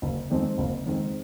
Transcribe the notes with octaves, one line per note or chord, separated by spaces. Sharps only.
F#1
F2 D#3 G#3 C4
F#1
F2 D#3 G#3 C4